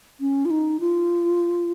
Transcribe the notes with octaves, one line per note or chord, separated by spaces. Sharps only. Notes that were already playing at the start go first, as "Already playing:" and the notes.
C#4
F4
D#4
F4